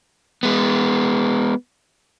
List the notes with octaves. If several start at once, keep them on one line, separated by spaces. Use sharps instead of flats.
G#3 B3